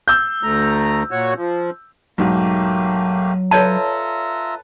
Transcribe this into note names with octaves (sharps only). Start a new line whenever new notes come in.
E6 G6
D2 A3 A#5
A#2 F#4 C#5
F3
B1 G#2 F#3 A3 A#3 G4
F4 A4 B4 C#5 D5 E5 A5 A#5